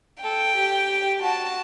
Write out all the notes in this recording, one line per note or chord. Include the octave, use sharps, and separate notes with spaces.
A4 G5
G4
F#4 A5